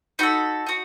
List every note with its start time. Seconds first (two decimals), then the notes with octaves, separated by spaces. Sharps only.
0.19 D#4 F#4 A4 B5
0.66 D#4 F#4